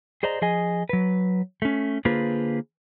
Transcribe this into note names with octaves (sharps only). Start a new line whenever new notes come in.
G#4 C5 D5 D#5 A#5
F3 G#4 D#5 G#5
F#3 B4
A3 C#4
D3 A#3 F4 G#4 B4 C5